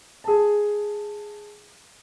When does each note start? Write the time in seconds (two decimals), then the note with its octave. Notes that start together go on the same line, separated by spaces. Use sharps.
0.24 G#4 A5